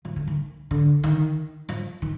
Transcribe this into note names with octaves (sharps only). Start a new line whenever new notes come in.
F3
D3
D#3
D3
D#3
F3
D#3